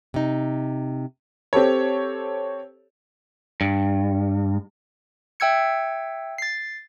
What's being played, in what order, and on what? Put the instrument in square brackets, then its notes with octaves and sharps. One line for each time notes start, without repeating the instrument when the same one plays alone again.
[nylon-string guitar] C3 D#4
[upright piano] C4 G4 A4 C#5
[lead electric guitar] G2
[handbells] E5 G5 E6 G#6 C#7
A6 C7